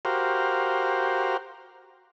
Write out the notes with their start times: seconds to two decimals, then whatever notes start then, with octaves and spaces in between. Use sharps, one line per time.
0.05 F#4 G4 A#4 C5 F5